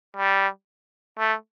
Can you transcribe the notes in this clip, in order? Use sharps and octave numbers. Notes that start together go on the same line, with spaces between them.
G3
A3